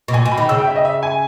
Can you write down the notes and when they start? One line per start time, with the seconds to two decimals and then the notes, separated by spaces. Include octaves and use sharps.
0.08 B2
0.13 A#2 G#5
0.25 B2
0.32 B5
0.37 D#3
0.49 C#3 E6
0.58 G5
0.67 E5
0.76 D#5
0.85 E5
1.03 G#5